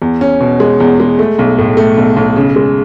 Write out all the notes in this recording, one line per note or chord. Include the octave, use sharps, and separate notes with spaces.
E2
C#4
B2
G#3
E2
G#3
A3
B1
A2
A3
B1
B1
C#3
G#3